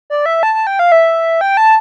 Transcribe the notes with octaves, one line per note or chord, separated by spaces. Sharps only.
D5
E5
A5
A5
G5
F5
E5
G5
A5